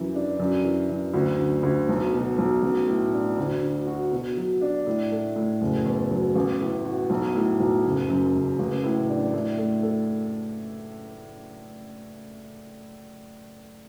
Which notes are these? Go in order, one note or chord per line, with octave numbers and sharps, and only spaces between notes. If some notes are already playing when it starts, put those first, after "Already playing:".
Already playing: F#2 E3
D4
F#2
E3
F#2
D2
D3
D2
B1
B2
B1
A1
A2
D4
D2
D3
F#4
B2
F#3
D4
A2
A3
A2
F#1
E2
F#3
A1
A2
F#4
B1
A2
B1
F#1
F#2
F#1
A1
A2
D4
A2
A3
A4